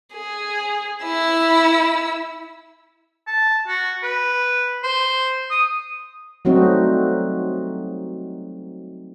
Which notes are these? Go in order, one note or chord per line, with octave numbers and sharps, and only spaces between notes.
G#4
E4 E6
A5
F#4
B4
C5
D#6
F#3 G3 A3 C4 D#4 F#4